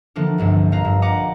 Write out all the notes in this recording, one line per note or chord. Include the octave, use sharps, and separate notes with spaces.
D3 E3 F3 A#3 B3 D4
G1 C2 G2
A#1 B4 F5 A#5
G2
D#5 F#5 A#5 D6